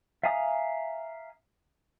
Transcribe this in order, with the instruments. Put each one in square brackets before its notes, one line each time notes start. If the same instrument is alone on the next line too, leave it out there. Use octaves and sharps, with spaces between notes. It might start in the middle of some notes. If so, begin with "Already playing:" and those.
[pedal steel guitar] E5 F5 G#5 A#5 D#6